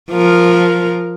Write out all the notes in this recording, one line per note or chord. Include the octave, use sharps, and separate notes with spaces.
F3 A#4